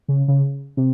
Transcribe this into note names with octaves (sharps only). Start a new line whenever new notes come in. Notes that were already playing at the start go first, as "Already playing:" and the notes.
C#3
C#3
C3